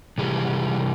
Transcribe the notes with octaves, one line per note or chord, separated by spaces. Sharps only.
C3 E3 G3 G#4